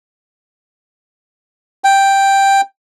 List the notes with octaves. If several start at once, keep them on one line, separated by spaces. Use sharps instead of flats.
G5